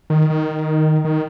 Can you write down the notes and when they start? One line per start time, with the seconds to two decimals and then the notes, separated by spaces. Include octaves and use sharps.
0.10 D#3
0.30 D#3
1.05 D#3